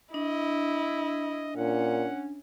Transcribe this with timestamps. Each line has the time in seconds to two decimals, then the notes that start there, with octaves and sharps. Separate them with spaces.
0.14 D4 E4 D#5
1.57 A#2 C#4 F#5